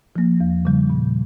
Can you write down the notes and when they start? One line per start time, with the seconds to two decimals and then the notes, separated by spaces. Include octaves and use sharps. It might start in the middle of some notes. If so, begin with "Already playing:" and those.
0.16 F3 A#3
0.41 E2
0.65 C#3 G3
0.90 A#2